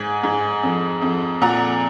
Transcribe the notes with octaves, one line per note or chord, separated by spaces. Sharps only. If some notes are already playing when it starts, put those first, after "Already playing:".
Already playing: G#2 G#5
G#2
F2
F2
A#2 F#5 A#5